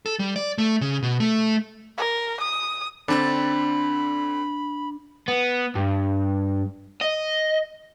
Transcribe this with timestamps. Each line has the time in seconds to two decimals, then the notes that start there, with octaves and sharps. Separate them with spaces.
0.06 A4
0.19 G3
0.36 D5
0.58 A3
0.81 C#3
1.03 B2
1.20 A3
1.98 A#4
2.42 D#6
3.08 D3 C4 D4 B5 A6
5.28 B3
5.75 G2
7.01 D#5